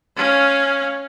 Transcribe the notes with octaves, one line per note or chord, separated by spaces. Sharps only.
C#4 F5